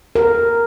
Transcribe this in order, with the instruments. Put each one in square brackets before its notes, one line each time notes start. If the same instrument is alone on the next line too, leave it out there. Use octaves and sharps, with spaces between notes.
[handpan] A#4